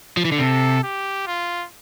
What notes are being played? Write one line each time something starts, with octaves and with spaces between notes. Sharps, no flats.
F3
E3
D3
C3 A4
G4
F4